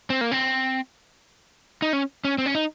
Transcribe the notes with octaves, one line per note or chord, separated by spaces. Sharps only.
C4
A#3
C4
D#4
C#4
C#4
C4
C#4
D#4